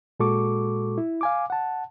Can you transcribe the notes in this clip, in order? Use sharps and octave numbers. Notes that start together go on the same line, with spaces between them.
A#2 G#3 F#4 A4 C#6 D6
E4
F5 G#5 D6
F#5 A5